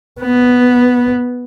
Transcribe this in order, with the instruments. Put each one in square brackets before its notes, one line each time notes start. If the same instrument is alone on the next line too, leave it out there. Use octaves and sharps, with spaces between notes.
[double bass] B3